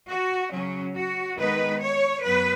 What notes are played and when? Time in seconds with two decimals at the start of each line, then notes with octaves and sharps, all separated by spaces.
0.09 F#4
0.52 C#3 F#3 C#4
0.96 F#4
1.39 D#3 G#3 B3 D#4 B4
1.81 C#5
2.24 F#2 F#3 B3 B4